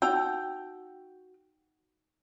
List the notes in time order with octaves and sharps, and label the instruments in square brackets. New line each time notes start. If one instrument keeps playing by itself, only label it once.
[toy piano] D#4 E6 [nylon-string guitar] F#4 [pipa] G5